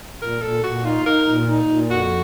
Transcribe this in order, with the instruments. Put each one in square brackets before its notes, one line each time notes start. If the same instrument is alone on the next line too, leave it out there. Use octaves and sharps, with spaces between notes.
[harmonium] A#2 [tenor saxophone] A#4
[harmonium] A#2 [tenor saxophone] A4
[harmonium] A#2 [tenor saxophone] F#4
[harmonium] D#4 [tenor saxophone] F4
[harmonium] D#4 [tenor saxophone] A#4
[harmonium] A#2
D#4
A#2
[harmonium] F2 [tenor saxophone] F#4